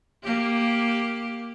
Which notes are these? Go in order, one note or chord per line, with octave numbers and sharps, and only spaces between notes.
A#3 G4